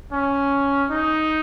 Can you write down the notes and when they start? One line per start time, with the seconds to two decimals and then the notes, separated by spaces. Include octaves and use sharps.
0.12 C#4
0.91 D#4